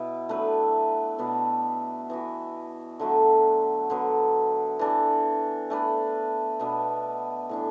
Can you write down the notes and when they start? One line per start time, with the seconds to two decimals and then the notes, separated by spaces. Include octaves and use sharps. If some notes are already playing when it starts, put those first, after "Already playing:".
Already playing: B2 B3 E4 B4
0.29 F#3 A3 D4 B4
1.18 B2 B3 D4 B4
2.10 E3 B3 F#4
2.99 D3 F#3 A3 F#4
3.90 D3 F#3 B3
4.79 E3 D4 A4
5.70 A3 D4 B4
6.59 B2 B3 D4
7.49 A2 E3 D4